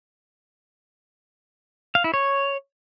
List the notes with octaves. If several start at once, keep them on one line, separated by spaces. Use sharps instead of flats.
F5
E4
C#5